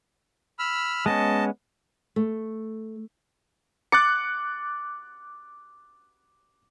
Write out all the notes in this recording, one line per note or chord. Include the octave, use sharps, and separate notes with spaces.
B5 E6 F6
G#3 B3 C#4 D#5 A5
A3
D6 F#6 A6 C#7